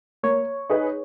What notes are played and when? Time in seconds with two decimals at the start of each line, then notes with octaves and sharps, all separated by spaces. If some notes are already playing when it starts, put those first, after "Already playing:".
0.23 A#3 C#5
0.69 D#4 G#4 B4